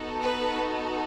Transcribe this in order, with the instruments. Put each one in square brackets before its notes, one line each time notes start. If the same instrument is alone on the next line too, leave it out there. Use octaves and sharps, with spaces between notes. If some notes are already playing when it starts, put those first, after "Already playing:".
Already playing: [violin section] B3 D#4 F#4 A4
B4